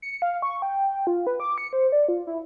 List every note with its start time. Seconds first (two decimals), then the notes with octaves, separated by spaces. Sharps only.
0.02 C#7
0.22 F5
0.42 C#6
0.62 G5
1.07 F4
1.27 B4
1.40 D6
1.58 C#7
1.73 C5
1.92 D5
2.09 F4
2.27 E4